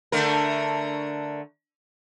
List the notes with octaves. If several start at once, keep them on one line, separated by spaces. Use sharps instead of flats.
D3 A3 A#4